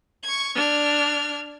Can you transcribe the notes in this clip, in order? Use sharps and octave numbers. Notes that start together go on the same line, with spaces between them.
C#6 G#6
D4 F6 G#6